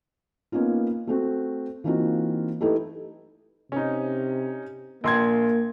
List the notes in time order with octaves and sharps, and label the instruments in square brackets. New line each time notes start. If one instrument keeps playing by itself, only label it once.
[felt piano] A#3 B3 C#4 D#4 F4
A3 C4 F#4
E3 A#3 C4 D#4 F4 F#4
A3 D#4 E4 G4 A4 B4
[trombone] C3 [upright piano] C#4 D#4
[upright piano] A#1 C6 G#6 [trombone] A#3